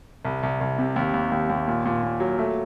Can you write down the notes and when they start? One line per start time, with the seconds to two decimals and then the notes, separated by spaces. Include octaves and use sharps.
0.25 C2
0.43 C2
0.61 C2
0.78 C3
0.96 D#2
1.14 D#2
1.32 D#2
1.49 D#2
1.68 A#2
1.85 A#2
2.03 A#2
2.20 F#3
2.39 A3